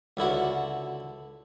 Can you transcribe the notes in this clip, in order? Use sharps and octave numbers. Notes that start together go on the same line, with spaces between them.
C#2 D3 E4 F#4